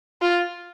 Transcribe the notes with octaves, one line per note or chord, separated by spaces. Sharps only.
F4